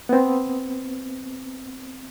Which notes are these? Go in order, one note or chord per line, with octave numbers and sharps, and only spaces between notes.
B3 C4